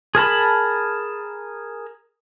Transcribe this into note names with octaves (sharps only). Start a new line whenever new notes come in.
G#4 A#4 A5 B5